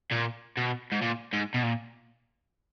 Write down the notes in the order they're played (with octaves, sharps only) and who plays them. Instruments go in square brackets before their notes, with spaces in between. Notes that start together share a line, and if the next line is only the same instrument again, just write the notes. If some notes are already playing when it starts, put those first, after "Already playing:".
[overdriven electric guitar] A#2
B2
G#2
A#2
G#2
B2
A#2